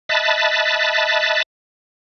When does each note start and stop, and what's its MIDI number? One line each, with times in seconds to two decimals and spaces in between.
0.09 1.43 75
0.09 1.43 76
0.09 1.43 81
0.09 1.43 83
0.09 1.43 90
0.09 1.43 93